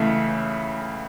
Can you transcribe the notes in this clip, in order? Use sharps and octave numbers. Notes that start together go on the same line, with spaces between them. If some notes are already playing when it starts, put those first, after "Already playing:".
Already playing: C#2 C#3 E3 A3 E5